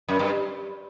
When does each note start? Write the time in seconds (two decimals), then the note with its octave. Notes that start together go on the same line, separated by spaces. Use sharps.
0.08 F#2
0.19 G2